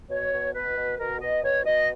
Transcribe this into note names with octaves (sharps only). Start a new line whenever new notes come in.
B2 C#5
B2
B2 B4
B2
B2 A#4
B2 D#5
B2 C#5
B2 D#5